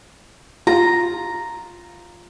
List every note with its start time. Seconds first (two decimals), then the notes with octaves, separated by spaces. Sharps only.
0.67 F4 A#5